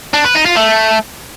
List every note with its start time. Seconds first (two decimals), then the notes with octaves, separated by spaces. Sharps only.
0.14 D4
0.24 B4
0.35 D#4
0.45 F4
0.56 A3